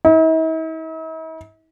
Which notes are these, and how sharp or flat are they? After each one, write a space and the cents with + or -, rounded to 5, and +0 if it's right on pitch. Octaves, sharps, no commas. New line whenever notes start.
E4 -45